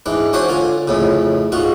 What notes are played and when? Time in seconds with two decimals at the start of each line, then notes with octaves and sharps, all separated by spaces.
0.06 G#2 E3 D4
0.33 D4 F#4 C5 C#5 G#5
0.49 D3 F4 G#5
0.88 F2 A2 C#3
1.52 G#2 F4 F#4